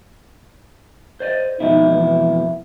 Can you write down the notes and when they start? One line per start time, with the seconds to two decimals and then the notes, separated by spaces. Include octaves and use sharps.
1.20 C5 D5 D#5
1.60 F2 B2 D#4 E4
1.91 E3